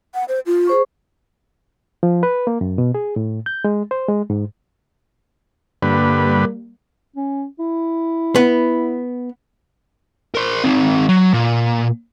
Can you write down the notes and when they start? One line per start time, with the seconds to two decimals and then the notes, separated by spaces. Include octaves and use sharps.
0.15 F#5
0.28 C5
0.46 F4
0.67 G#4 C5 C#6
2.03 F3
2.23 B4
2.47 A#3
2.61 F#2
2.78 B2
2.95 G#4
3.16 A2
3.46 G6
3.64 G#3
3.91 C5
4.08 G#3
4.30 G#2
5.83 G2 D3 G3 A#3 B4
7.16 C#4
7.59 E4
8.36 B3
10.35 A#4 C5
10.64 D#3 C4
11.09 F#3
11.33 A#2